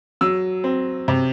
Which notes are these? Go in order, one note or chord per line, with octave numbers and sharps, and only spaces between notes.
F#3 E6
C4
C3